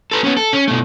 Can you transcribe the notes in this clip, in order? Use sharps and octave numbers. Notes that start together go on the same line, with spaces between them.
A4 B4
B3 C#4
A4
C#4
B2 A3